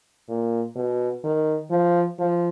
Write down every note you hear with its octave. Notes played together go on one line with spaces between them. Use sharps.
A#2
B2
D#3
F3
F3